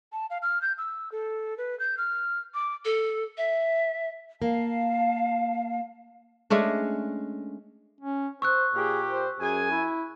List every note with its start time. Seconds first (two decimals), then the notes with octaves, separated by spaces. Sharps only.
0.12 A5
0.30 F5
0.42 F6
0.62 G6
0.78 E6
1.12 A4
1.58 B4
1.80 G6
1.98 F6
2.54 D6
2.85 A4
3.37 E5
4.42 A#3 F5 A5
6.50 G#3 A3 C#4 D4
8.01 C#4
8.42 C5 C#6 E6 F#6
8.74 A#2 G4 G#4
9.09 C5
9.39 F#2 G#4 G#5
9.71 E4